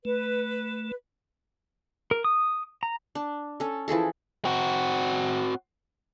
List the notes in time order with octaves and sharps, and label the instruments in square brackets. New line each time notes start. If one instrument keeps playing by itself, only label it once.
[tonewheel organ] A3 [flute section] B4
[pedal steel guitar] A#4
D#6
A#5
[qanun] D4
C#4 A4
E3 F3 G#4 A4
[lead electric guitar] C4 F#4